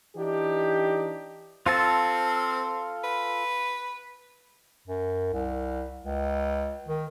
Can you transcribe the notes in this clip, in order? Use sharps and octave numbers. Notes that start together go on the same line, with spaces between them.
E3 D4 D#4 G4
C4 F4 A4 A5
B4
F#2
C2
C#2
D#3